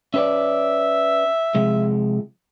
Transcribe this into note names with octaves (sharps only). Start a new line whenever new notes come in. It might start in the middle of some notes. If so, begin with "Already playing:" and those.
C#4 B4 D5 E5
C3 F3 G#3